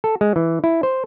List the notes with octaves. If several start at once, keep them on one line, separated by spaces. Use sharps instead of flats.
A4
G#3
E3
E4
C5